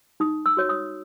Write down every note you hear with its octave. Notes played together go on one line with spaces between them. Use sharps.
D#4 D#6
E6
F#4 C#5
D#6